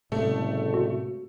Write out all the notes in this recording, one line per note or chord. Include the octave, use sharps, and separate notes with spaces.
F#1 A2 C3 G#3 A3
F#4